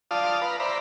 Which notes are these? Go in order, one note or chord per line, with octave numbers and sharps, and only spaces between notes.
F4 D5 F5 A5 D#6
B4 F5 A#5
C5 D5 E5 A#5 B5